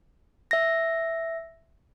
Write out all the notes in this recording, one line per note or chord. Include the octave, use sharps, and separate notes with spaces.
E5 A#6